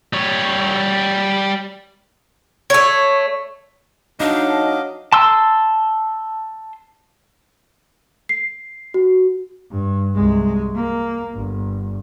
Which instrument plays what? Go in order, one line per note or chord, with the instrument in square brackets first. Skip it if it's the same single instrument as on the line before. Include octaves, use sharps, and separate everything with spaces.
[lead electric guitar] G3 C#5
[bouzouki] A3 C#5
[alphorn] F#3 [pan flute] D4 [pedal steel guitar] D#4 [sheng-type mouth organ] D#5 F5 D6
[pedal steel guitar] A5 C6 E6
[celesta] C7
F#4
[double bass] G2
C2 G#3
A#3
G1